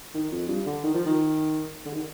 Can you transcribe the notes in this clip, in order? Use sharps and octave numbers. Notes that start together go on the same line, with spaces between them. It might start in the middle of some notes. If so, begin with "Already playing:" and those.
D#3
F2
G2
D3
D#3
F3
D#3
D3
D#3